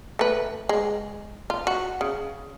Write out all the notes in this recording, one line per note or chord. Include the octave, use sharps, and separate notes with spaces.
A3 B4
G#3
F4
F#4
C#3